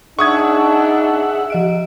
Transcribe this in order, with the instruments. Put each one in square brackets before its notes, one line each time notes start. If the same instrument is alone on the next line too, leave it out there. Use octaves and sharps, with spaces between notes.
[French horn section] D4 D#4 [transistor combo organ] G#4 E5 F#5 [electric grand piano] C#6 D#6 G#6
[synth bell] F3 D#5 D7